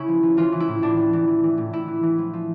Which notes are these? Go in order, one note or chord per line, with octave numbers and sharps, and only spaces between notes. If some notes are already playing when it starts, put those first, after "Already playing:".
Already playing: C#3 C#4 E4
F3
F3
E3 F4
E3
E4
A2
A2 D4
E3
E3
E3
E3
A2
A2 E4
E3
E3
F3
F3